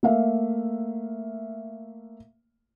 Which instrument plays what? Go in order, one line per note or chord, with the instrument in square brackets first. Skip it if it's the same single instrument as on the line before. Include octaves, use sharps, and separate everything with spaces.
[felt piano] A3 A#3 E5 F5